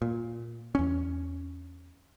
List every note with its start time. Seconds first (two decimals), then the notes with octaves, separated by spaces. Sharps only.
0.02 A#2
0.75 E2 C#4